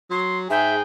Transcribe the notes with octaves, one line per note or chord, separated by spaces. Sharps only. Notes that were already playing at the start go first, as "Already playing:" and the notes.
F#3 C6
G#2 G#4 E5 G5